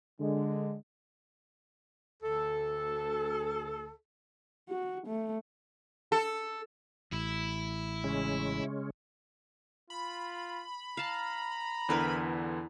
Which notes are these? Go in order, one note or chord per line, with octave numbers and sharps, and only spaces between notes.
D3 G#3
D2 A4
F#4
A3
A4
A1 E4
C#3 G#3 C#4
F4 B5
F5 A5 A#5
E2 D3 E4 A#4 B4